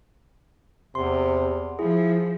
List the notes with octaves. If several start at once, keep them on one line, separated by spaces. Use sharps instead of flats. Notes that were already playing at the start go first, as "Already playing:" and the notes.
E2 C3 C6
F3 E4 G#4